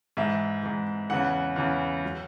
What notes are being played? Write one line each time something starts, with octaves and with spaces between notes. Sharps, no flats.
G#2 E3 E5
G#2 E3
E2 C#3 E3 F#5
E2 C#3 E3
F#3